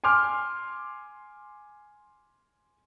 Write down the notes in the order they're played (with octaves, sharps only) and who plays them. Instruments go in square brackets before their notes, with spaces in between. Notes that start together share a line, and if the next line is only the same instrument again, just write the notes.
[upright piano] G#5 C6 D6 F6